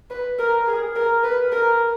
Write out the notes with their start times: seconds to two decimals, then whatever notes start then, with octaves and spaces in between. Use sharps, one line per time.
0.10 B4
0.38 A#4
0.67 G#4
0.95 A#4
1.24 B4
1.52 A#4